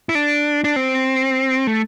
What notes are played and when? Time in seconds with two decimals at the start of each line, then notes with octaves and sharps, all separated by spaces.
0.09 E4
0.15 D4
0.64 D4
0.76 C4
1.67 A3